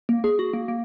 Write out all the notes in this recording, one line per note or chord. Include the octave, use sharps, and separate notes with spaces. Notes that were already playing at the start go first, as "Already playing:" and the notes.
A#3
G#4
F#4
A#3
A#3